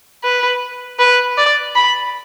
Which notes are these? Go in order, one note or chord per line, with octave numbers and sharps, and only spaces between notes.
B4
B4
D5
B5